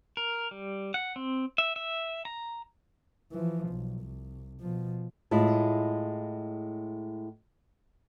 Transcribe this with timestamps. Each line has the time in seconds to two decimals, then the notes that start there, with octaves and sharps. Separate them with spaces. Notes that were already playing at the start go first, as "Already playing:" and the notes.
0.17 A#4
0.51 G3
0.94 F#5
1.16 C4
1.58 E5
1.76 E5
2.25 A#5
3.32 E3 F3
3.69 B1
4.01 C2
4.60 B2 F3
5.31 A2 G#3 E4 F4